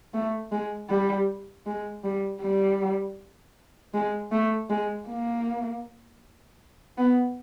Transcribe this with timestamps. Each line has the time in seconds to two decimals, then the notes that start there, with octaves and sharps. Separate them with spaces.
0.14 A3
0.52 G#3
0.90 G3
1.66 G#3
2.04 G3
2.41 G3
3.94 G#3
4.32 A3
4.69 G#3
5.08 A#3
6.98 B3